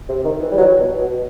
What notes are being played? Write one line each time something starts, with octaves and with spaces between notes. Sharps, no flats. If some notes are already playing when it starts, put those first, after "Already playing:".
C3
D#3
E3
G3
F#3
B2
B2